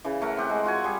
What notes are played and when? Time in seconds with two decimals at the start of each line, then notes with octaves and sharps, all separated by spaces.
0.05 C#3 E3
0.22 A3 A#4 F#5
0.37 C4 G4 F#5
0.50 G#3
0.64 F4 F#4 F#5 G#5
0.84 G3 G#4